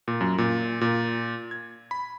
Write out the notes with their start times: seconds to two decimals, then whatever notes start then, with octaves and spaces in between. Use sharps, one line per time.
0.08 A#2
0.21 F#2
0.38 A#2
0.81 A#2
1.51 G#6
1.91 B5